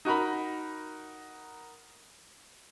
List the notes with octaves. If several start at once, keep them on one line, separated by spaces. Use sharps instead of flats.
D#4 F#4 A#4 A#5 B5